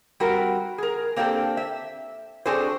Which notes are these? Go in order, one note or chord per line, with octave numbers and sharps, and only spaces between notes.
G3 C4 F#4 A#4
G#4 A#4
A#3 C4 D4 G4 A4
E5
C4 D4 F#4 G#4 A4 C5